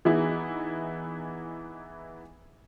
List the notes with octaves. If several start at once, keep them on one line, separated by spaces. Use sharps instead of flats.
E3 B3 D#4 E4 G#4